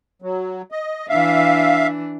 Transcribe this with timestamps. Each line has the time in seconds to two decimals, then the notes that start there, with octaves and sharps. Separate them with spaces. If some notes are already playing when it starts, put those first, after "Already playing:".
0.22 F#3
0.72 D#5
1.09 E3 D4 E5 F5